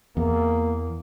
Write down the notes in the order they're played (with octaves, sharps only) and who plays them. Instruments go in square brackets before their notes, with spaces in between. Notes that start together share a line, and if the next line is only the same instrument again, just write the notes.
[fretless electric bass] E2 [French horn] A#3